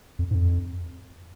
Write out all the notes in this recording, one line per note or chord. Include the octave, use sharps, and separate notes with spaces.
F2
G#2
F2